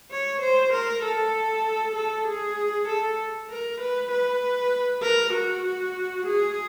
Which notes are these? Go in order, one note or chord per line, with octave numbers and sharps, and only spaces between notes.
C#5
C5
A#4
A4
A4
G#4
A4
A#4
B4
B4
A#4
F#4
G#4